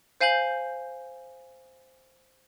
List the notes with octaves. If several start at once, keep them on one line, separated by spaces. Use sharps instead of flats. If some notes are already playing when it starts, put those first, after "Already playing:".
C5 F5 G#5 G6 F#7